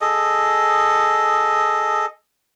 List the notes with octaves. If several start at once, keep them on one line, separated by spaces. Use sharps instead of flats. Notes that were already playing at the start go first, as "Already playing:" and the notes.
G#4 A4 D#5